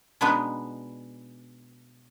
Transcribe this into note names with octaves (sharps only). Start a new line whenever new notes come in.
B2 G#3 B3 D4 D#4 B4